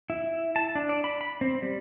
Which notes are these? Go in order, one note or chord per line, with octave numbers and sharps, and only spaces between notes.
E4
A5
D4
D5
B5
B5
C4
G3